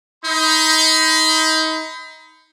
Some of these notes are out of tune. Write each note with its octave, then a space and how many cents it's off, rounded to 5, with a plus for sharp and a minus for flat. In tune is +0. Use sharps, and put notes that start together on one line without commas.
D#4 +25 B5 +40